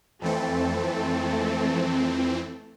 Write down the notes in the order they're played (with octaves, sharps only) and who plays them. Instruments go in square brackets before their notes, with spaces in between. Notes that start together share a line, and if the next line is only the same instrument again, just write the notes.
[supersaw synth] F2 E3 C4 [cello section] A3 A4